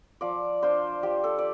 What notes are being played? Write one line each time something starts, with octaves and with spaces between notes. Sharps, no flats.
F3 D5
D4 F4 C5
F3 G4
A4
D5